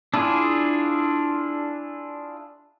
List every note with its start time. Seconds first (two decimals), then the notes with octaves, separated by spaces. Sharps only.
0.14 D4 E4 F4 G#4